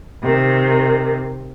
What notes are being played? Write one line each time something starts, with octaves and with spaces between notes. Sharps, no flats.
C3 D#3